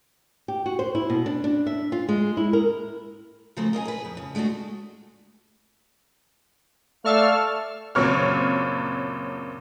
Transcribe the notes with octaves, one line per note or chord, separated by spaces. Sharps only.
G4
F#4
C5
E4
B2
D4
D4
E5
F4
G#3
E4
A#4
C#3 F3 F#3 A3 C4
A#4 D#5 F5 G#5
G#4 B4
F2
C#3
G#3 A3 C4 D4 F#4
A3 D5 F5 A5 C#6 E6 F6
F#1 A#2 F#3 C4 C#5 F6